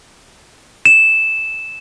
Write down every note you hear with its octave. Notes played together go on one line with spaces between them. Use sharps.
E7